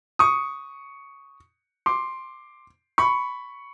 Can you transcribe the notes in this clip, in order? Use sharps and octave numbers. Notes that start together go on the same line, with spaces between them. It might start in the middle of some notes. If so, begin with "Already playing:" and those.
C#6 D#6
C6 D6
B5 C#6